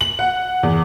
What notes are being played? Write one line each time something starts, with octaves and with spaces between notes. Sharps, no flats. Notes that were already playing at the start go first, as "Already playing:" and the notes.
F#7
F#5
E2